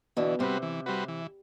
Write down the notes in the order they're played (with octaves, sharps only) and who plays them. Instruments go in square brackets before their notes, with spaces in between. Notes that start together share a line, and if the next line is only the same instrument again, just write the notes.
[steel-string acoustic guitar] B2 D3 [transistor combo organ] E3
[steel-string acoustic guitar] C3 [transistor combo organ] G3 C4 F#4 B4
[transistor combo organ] E3
G3 C4 F#4 B4
E3